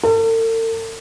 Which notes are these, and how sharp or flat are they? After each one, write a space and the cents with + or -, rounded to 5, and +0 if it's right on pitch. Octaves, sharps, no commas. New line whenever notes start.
A4 +45